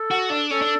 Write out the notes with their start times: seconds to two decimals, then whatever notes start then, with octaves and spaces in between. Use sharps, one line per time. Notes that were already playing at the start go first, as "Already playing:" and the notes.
Already playing: A4
0.11 F#4
0.30 D4
0.50 C#4 A4
0.62 D4